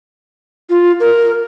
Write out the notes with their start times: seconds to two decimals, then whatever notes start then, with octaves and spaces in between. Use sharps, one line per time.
0.70 F4
1.00 A#4